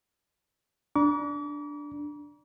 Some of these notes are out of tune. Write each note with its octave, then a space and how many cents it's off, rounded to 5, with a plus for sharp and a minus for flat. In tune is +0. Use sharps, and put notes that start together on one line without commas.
D4 +0 A#5 +35 D6 -40